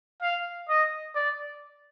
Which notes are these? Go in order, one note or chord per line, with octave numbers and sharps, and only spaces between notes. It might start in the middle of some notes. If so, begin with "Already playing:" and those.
F5
D#5
D5